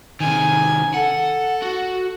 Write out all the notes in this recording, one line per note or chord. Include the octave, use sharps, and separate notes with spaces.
C3 D#3 G#5
A4 F#5
F#4